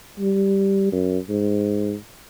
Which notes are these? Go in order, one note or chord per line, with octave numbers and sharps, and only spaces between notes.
G3
F#2
G#2